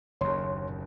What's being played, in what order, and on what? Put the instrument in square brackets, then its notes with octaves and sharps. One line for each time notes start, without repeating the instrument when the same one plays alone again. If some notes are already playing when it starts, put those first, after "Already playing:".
[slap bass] F#1 D#2 [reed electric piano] C#5 C6